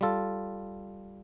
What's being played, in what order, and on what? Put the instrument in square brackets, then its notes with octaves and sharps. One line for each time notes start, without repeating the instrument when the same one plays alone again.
[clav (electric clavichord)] G3 F4 A4